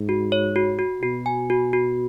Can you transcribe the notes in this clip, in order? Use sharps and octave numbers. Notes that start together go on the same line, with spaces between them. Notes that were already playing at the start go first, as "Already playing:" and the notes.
Already playing: G#2
F#4
C#5
F#4
F#4
B2 F#4
G#5
F#4
F#4